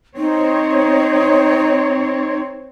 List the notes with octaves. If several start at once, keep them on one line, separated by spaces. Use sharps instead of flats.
C4 D#4 C#5